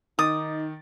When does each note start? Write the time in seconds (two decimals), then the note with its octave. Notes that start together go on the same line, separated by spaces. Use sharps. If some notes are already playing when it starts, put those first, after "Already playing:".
0.19 D#3 D#4 D6 D#6 A6